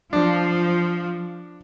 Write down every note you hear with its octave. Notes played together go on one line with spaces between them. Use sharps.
F3 D4